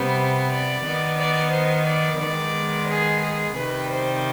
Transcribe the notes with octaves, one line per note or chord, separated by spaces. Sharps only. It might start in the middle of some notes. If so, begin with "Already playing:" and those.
Already playing: C3 G3 B3 C5
D5
D#3 B3
D5
C5
D5
D#3 G#3 B3 D5
G#4
G#4
C3 D#3 G3 B4
C5